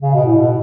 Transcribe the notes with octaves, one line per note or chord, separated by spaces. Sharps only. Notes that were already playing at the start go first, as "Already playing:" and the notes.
C#3
B2
A2
B2